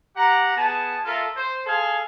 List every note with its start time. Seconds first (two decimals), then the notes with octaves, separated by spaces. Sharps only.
0.16 G4 F#5 A#5
0.56 B3 G#4 A5
1.05 F4 A4 A#4 E5
1.36 C5
1.66 G#4 A4 F5 G#5